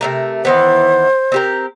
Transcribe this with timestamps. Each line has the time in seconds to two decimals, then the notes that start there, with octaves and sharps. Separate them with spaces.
0.01 C3 A3 A#4
0.45 D#3 E3 B3 C5
1.32 C4 G4 A#4